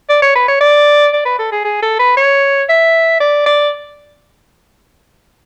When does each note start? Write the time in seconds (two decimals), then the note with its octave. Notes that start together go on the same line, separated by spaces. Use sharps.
0.09 D5
0.22 C#5
0.35 B4
0.48 C#5
0.61 D5
1.13 D5
1.25 B4
1.39 A4
1.52 G#4
1.65 G#4
1.82 A4
1.99 B4
2.17 C#5
2.69 E5
3.20 D5
3.46 D5